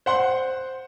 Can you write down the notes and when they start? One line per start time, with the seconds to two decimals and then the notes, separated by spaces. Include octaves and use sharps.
0.06 C5 F#5 C6